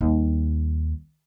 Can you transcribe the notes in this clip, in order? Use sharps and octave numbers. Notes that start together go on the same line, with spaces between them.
D#2 G3